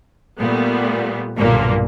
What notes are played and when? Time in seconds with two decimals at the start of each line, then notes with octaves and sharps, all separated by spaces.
0.40 A#2 G3 A3 B3
1.37 B1 G2 A#2 D3 A#3